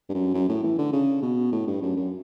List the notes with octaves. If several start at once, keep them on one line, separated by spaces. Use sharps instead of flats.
G2
F#2
F#2
A2
E3
D3
C#3
B2
A2
G2
F#2
F#2